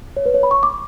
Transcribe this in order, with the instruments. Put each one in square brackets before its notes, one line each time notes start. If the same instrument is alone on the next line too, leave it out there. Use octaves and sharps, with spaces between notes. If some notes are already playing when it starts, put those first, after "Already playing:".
[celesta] C#5
B4
C#5
B5
C#6
D6